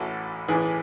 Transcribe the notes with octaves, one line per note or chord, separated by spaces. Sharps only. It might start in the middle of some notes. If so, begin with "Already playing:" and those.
Already playing: A1 A2 E3 F#4 A4
A1 A2 E3 G#4 B4